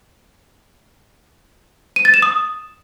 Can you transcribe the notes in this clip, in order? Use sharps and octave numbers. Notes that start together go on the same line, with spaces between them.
D#7
A6
E7
D#6